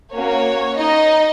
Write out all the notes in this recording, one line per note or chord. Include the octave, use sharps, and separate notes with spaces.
A#3 C#4 F#4 C#5
D#4 D#5